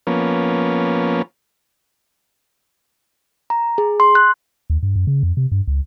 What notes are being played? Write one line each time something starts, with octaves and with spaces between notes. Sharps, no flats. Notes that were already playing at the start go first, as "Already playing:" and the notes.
F3 A#3 B3 C#4
A#5
G#4
C6
F#6
D#2
G2
F#2
C#3
F2
C3
G2
C#2